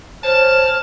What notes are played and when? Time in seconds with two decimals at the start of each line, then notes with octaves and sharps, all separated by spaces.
0.23 C5 C#5 A5 F6